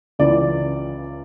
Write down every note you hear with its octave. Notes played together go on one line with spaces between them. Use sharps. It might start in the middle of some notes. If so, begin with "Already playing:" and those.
C#2 C#3 E3 D5